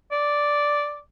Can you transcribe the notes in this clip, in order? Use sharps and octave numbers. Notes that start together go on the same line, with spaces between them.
D5